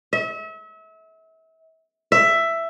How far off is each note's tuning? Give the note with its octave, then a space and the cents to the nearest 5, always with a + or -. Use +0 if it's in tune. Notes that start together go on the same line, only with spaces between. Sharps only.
E5 -35
E5 +10